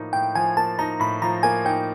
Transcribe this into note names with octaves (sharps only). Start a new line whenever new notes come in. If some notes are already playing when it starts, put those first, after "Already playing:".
Already playing: A2 F3 A#3 D#4
A2 G5
F3 G#5
A#3 A5
D#4 A#5
A2 B5
F3 A#5
A#3 G#5
D#4 G5